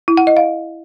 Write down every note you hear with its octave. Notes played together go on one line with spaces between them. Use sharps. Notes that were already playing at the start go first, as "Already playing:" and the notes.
E4
F#5
D#5
F5